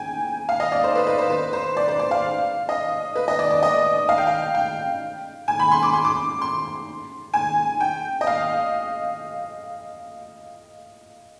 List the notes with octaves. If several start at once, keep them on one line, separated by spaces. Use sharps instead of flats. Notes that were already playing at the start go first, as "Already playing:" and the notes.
Already playing: G5 G#5
F5
D#5
D5
C5
B4
B4
C5
B4
C5
D5
C5
D5
F5
D#5
B4
D#5
D5
D5
D#5
F5
G5
F5
G5
G#5
B5
C6
D6
C6
D6
C6
G#5
G5
D#5
F5